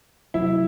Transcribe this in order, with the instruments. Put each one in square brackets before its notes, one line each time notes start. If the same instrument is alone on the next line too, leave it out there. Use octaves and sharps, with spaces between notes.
[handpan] C3 F#3 A3 [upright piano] E4